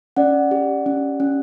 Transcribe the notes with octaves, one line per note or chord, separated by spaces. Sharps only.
C#4 D5 F#5
G4
C#4
C#4